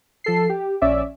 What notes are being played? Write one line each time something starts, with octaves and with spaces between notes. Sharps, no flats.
F3 A4 C7
G4
A#1 C#4 D5 E5